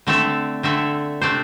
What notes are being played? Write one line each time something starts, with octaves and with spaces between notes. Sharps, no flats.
D3 A3 C4 A4 E5
D3 A3 C4 A4 E5
C3 A3 D4 C5